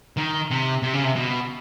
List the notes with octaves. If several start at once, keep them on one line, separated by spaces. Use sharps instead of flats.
D#3
C3
C3
C#3
C3
B2